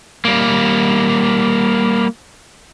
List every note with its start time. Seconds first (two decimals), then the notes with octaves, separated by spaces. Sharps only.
0.25 G3 A#3